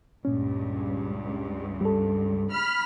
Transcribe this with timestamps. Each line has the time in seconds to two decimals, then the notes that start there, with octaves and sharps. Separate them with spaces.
0.25 C#2 G2 A#2 C#4
1.81 G3 A4
2.51 B5 F6